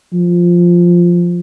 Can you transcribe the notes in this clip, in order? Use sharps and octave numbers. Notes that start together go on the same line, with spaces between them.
F3